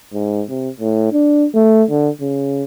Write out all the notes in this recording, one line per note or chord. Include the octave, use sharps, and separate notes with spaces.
G#2
C3
A2
D4
A3
D3
C#3